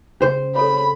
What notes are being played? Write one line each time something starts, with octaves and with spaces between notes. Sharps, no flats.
C#3 C5 G5
A4 C#5 B5